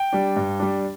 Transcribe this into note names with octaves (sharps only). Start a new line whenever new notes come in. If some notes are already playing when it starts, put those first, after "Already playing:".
Already playing: G5
G3 D4
G2
G3 D4